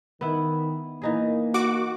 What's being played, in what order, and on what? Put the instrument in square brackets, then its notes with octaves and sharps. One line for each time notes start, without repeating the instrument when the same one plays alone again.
[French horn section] D#3 [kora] B3 E4
[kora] E3 D#4 G#4 [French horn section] A#3
[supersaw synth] F#4 D6